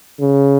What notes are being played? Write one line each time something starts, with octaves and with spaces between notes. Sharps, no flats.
C#3